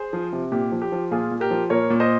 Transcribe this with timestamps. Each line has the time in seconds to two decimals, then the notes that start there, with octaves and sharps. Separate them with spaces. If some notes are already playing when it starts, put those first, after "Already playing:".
Already playing: G#4 C5
0.13 F3
0.32 C3
0.52 A#2 G4
0.72 F3
0.82 G4
0.92 F3
1.11 A#2 F4 G#4
1.31 A#2
1.40 G4 A#4
1.50 F3
1.70 A#2 A#4 C#5
1.90 A#2
2.00 C5 D#5